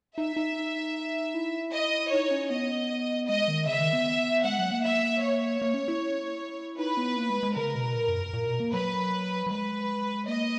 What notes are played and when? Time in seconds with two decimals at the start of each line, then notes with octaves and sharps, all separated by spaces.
0.17 D#4 E5
0.36 D#4
1.34 E4
1.73 D#5
2.12 D#4 C#5
2.31 C#4
2.50 B3 D#5
3.28 G#3 D#5
3.48 D#3
3.67 C#3 E5
3.80 D#3
3.93 B3
4.45 G#3 F#5
4.59 F#3
4.71 A#3
4.84 E5
5.23 C#5
5.62 A#3
5.74 C#4
5.88 E4
6.78 D#4 B4
6.97 B3
7.17 A#3
7.30 G#3
7.43 G#3
7.56 C#3 A#4
7.75 B2
7.95 A#2
8.08 F#2
8.33 A#2
8.46 B2
8.60 A#3
8.73 F#3 B4
9.47 F#3
9.50 G#3 B4
10.28 A#3 D#5